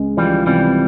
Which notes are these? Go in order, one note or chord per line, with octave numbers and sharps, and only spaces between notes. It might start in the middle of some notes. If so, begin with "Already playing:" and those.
Already playing: C#2 G#3
E3 F3 G3
C3 E3 G3